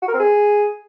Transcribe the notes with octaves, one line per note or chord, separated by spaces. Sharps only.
F#4
A#4
C4
G#4